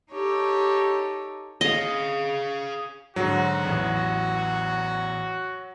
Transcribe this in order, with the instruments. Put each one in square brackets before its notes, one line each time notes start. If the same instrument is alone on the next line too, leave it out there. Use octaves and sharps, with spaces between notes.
[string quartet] D#4 G4 A4 C#5
[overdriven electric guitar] G#4 F5 [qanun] D#5
[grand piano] G#2 D3 [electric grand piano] F#3 [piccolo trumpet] F#4
[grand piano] A1 E2